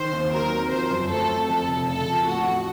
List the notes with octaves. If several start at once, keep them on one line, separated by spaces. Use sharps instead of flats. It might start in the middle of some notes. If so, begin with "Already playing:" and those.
Already playing: D#3 C5
D#2
F#3 A#4
C4
F3 C5
F#2
A3 A4
C4
F2 A4
F1
C#3 A4
F3
A2 F#4
A1